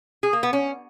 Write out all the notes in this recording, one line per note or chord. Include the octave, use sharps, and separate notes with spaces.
G#4
A#3
B3
C#4